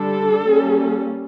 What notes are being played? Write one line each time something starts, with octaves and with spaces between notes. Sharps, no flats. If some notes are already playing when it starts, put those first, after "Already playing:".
Already playing: D3 G3 D4 A4
G3 A#3 C#4